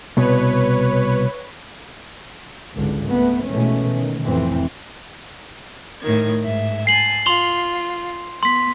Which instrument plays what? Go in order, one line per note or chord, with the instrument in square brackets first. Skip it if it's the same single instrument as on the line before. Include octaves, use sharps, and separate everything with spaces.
[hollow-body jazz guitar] C2 B2 [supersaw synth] B4 C#5
[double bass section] G#1 C#2 D3
A3 B3
B2 D#3 E3 G#3 A3 C#4
D#3
F1 F2 A2 E3 C4
[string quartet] A2 D#3 G#6
G#2 E5
[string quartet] G#5 A5 [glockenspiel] C7 F#7
[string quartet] F4 [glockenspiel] C6 F7 G7
[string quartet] B3 [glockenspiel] C6 B6